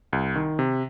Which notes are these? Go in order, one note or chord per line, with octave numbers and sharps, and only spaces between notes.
C2
D#3
C3